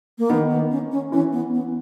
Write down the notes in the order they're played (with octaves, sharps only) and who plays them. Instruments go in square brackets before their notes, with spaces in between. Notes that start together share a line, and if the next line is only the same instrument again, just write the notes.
[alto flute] A#3
[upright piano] D#3 [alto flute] B3
[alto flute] B3
C#4
C#4
[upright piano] E3 [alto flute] C#4
[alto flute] B3
B3